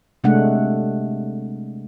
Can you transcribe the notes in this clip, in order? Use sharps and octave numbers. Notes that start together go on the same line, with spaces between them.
C3 G#3 A3 D4 F#5